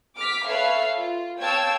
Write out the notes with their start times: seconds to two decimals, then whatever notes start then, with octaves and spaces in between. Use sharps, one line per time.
0.17 D6 F6 B6
0.46 A4 B4 C#5 E5 F5
0.97 F4
1.40 C#5 F5 G5 A5 E6 G#6